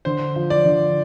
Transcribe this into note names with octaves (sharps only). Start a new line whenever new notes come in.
D3 C5
F3
D5
D3